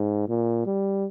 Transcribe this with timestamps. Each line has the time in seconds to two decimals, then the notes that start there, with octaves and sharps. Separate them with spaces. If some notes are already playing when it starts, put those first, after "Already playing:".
Already playing: G#2
0.28 A#2
0.66 G3